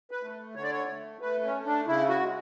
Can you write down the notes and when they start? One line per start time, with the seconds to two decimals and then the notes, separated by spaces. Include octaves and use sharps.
0.11 B4
0.23 A3
0.55 D3 C#5
0.63 D5
0.71 C#5
0.89 A3
1.21 A3 B4
1.44 C#4
1.54 A3
1.66 D4
1.87 C#3 E4
2.09 F#4
2.20 G#3